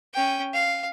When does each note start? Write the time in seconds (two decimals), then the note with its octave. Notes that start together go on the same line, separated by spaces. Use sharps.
0.14 C#4 G5
0.53 F5